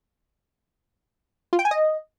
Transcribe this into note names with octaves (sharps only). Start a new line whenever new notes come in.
F4
G5
G#5
D#5